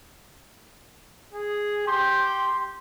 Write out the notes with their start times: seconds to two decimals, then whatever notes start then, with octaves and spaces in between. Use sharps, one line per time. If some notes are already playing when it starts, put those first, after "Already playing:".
1.33 G#4
1.87 G4 C6